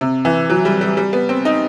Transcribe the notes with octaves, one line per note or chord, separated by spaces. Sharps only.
C3
E3
F#3
G3
G3
G3
B3
C4
D#4